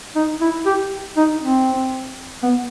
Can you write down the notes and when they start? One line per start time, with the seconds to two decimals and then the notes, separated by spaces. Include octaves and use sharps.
0.15 D#4
0.41 E4
0.66 G4
1.17 D#4
1.41 C4
2.43 B3